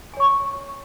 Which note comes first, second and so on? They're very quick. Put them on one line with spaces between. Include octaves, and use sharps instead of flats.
G#5 C#5 C#6